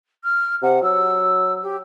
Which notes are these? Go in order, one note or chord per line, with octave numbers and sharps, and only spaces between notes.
F6
C3 F#5
F#3 E6
G4